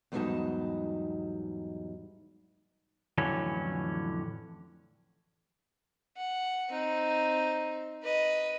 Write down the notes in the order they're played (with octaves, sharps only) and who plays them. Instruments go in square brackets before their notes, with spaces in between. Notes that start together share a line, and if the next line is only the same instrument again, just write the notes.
[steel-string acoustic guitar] E2 G#2 F#3 G3 D#4 A5
[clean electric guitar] F2 A2 D3 E3 F#3 C#4
[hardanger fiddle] F#5
C4 D#4
B4 D#5